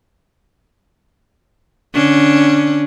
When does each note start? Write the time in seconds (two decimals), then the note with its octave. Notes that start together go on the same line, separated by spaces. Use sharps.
1.94 D3 C#4 D4